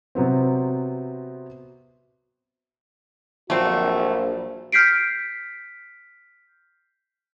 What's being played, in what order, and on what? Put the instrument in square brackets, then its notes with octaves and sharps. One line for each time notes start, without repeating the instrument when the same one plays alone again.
[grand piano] C3 F#3 B3 C4
[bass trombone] A#1 [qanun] F3 F#3 [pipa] A3 C4 [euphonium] F#4
[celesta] F6 G6 B6 C7 D7